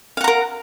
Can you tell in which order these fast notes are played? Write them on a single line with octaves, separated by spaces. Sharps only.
F5 F#5 A#5 A#4